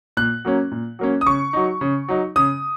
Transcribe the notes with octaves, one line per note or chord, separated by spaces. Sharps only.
A#2 F#6
F#3 A#3 C#4
A#2
F#3 A#3 C#4
D#6
C#3 C#6
F#3 D#4
C#3
F#3 D#4
C#3 D#6